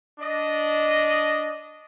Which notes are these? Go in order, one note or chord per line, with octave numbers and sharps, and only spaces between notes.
D4 D#5